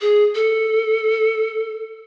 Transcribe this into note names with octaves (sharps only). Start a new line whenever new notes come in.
G#4
A4